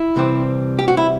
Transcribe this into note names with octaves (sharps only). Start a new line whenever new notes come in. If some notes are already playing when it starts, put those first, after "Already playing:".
Already playing: E4
C2 C3 E3 G3 C4
G4
F#4
E4